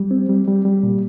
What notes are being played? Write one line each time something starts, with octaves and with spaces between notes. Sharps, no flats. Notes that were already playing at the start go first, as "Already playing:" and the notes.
Already playing: G3
C4
G3
G3
G3
A#2